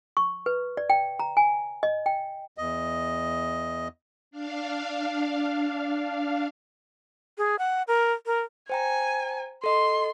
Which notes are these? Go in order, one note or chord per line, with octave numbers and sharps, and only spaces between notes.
C#6
B4
D5
G5
A#5
G#5
D#5
G5
E2 D#5
D4 F5
G#4
F#5
A#4
A#4
C5 G5 G#5 A#5
A4 D#5 C6